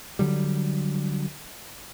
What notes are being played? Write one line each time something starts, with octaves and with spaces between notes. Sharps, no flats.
D3 F#3 G3